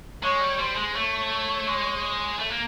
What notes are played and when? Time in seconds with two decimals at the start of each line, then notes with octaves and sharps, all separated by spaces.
0.23 G#3 C#5
0.41 G3
0.59 G3 C5
0.77 G#3
0.95 A3 C#5
1.68 G#3
2.39 A3
2.50 A#3